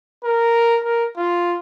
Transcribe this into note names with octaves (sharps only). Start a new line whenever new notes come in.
A#4
A#4
F4